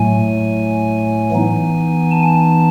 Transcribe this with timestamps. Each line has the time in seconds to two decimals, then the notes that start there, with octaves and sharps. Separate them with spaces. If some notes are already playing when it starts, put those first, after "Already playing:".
Already playing: A2 F#3 A3 G#5
1.31 E3 B3 D#4
2.11 A5